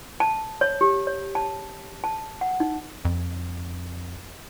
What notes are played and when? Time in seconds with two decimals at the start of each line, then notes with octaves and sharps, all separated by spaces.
0.20 A5
0.61 C#5
0.81 G4
1.07 C#5
1.35 A5
2.04 A5
2.41 F#5
2.60 D#4
3.05 F2